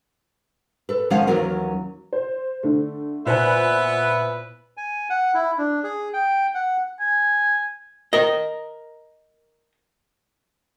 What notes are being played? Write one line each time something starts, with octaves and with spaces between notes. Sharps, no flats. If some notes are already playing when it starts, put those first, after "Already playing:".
A4 B4
D#3 F3 G#3 C#4 F5 F#5
D#2 E3 F#3 C#4 A#4 F#5
C5
D3 A3
A#2 B3 E4 B4 C5 G#5
G#5
F#5
E4
D4
G#4
G5
F#5
G#5
A#4 D#5